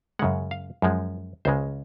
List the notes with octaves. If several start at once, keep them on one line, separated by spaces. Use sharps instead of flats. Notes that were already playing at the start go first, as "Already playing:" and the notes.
F#2 C#3 G#3 F#5
F5
F#2 F3 G#3
C#2 C#3 G#3 C5